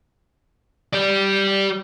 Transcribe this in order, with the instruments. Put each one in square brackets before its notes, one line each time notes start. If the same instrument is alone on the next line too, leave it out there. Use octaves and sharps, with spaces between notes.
[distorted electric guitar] G4 D5